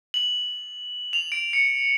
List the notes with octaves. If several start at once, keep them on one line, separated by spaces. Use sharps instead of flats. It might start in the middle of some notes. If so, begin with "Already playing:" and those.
F#7
F7
D7
C#7